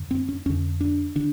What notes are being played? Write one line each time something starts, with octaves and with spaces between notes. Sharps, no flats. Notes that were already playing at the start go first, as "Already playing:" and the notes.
Already playing: F#2 D3
C4
C#4
F2 D3 C#4
D4
D3 D4